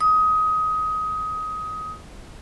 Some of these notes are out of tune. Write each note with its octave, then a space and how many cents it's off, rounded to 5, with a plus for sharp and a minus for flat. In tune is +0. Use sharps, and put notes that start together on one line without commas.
D#6 +20